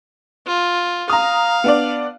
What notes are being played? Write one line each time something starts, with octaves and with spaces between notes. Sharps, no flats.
F4
F5 A#5 D#6
B3 D4 D5